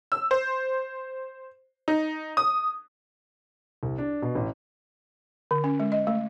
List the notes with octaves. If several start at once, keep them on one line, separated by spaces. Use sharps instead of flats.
E6
C5
D#4
D#6
C2
D4
B2
A1
D3
C#4
G#3
D#5
A3